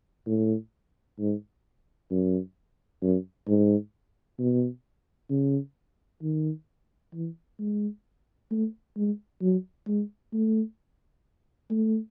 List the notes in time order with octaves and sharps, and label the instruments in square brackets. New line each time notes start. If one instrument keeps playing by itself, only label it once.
[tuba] A2
G#2
F#2
F#2
G#2
B2
C#3
D#3
E3
G#3
A3
G#3
F#3
G#3
A3
A3